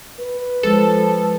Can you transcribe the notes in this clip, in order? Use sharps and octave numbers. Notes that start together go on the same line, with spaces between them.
B4
F3 G#3 F4 A4